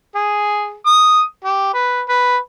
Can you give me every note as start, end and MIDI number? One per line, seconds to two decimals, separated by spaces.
0.15 0.74 68
0.86 1.22 87
1.44 1.72 67
1.74 2.02 71
2.09 2.37 71